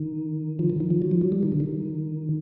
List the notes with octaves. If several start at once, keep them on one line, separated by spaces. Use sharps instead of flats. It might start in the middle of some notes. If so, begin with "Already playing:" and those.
Already playing: D#3
F3
D#3
D#3
F3
F#3
F3
F#3
G3
D#3
D3
D#3